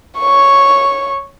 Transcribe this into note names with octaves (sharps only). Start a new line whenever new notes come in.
C#5 C#6